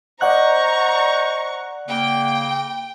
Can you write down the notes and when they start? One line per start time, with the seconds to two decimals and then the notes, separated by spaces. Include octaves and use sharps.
0.21 C5 D5 D#5 F#5 A#5 C#6 F#6
1.88 C#3 A#3 G5